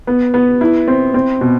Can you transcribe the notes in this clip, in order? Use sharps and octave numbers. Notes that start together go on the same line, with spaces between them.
B3
B3
E4
C4
C4
B2